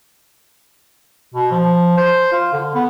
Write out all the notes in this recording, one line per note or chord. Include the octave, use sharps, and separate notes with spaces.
B2
F3
C5
F4
D3
B3